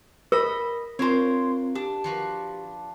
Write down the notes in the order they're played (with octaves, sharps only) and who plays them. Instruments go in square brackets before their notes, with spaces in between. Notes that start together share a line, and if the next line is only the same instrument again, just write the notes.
[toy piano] A#4 [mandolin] D#5 B5
[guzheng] A#3 D4 [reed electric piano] C4 F4 [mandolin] C5 C#5
[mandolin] D4 [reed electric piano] G4
[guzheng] F3 F#4 B4